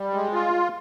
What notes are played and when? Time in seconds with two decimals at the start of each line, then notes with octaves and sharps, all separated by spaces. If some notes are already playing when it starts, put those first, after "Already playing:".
Already playing: G3
0.14 G#3
0.33 F4